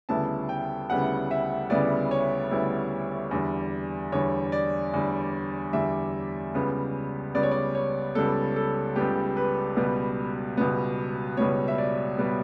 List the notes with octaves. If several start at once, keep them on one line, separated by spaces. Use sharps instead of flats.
D2 C#3 G3 B3 E4 A5
G5
D2 C#3 G3 B3 E4 F#5
E5
D2 C#3 G3 B3 E4 D5
C#5
D2 C#3 G3 B3 E4
E2 D3 G3
E2 D3 G3 C#5
D5
E2 D3 G3
E2 D3 G3 E5
C#2 C#3 G3 B3
C#2 C#3 G3 B3 D5
C#5
D5
C#5
C#2 C#3 G3 B3 A4
A4
C#2 C#3 G3 B3 G4
B4
C#2 B2 G3 B3
C#2 B2 G3 B3
C#2 B2 G3 B3 C#5
E5
D5
B2 G3 B3